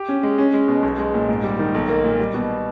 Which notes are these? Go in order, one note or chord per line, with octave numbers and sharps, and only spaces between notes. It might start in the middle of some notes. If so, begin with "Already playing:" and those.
Already playing: G4
C#4
G#3
C#4
G#3
B2
B1
G#3
A#2
G#2
G3
D#3
B1
A#3
A#2
G3
B2